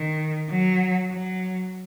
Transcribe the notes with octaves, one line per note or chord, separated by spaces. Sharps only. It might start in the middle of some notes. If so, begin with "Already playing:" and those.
Already playing: D#3
F#3
F#3